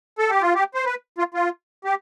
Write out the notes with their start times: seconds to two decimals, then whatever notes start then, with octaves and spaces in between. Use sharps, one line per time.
0.19 A4
0.30 G4
0.42 F4
0.55 G4
0.74 C5
0.85 B4
1.18 F4
1.34 F4
1.85 G4